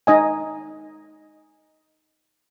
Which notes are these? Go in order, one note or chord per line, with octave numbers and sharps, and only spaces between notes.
D#4 D#5 G#5